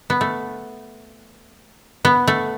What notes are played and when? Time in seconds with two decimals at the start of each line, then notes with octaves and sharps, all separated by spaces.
0.10 B3
0.21 A3
2.05 B3
2.28 A3